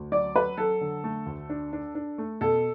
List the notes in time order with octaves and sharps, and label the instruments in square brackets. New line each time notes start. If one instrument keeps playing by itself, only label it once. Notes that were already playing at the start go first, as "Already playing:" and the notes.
Already playing: [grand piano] D2
[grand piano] F#3 [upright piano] D5
[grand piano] F#3 [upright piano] B4
[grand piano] F#3 [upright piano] A4
[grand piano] D3
A3
D2
D4
D4
D4
A3
[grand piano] B2 [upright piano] A4